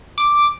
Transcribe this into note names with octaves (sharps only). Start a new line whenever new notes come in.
D6